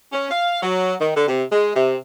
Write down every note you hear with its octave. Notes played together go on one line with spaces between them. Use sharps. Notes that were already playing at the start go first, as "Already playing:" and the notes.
C#4
F5
F#3
D#3
D3
C3
G#3
C3